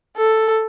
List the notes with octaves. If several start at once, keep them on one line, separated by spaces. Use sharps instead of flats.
A4